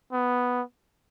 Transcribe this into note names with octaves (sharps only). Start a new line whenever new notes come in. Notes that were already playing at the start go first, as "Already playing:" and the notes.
B3